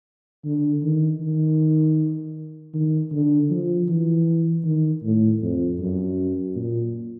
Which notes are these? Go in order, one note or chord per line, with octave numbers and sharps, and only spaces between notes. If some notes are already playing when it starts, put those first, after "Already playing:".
D3
D#3
D#3
D#3
D3
F3
E3
D#3
A2
F2
F#2
A#2